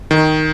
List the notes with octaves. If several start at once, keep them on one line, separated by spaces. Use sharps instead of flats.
D#3